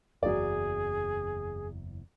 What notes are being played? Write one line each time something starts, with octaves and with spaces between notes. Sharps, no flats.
F#1 E2 F#3 G#4 D5